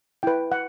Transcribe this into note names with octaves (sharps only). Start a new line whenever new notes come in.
E4 B4 G5
F#5